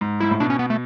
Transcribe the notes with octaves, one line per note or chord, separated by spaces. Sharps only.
G#2
G#2 E4
A2
B2 D4
C#4
B3
A3